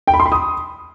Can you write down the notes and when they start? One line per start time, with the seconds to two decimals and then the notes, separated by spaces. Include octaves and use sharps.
0.08 G5
0.14 B5
0.20 C6
0.26 B5
0.32 D#6